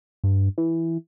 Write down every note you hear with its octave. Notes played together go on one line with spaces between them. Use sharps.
G2
E3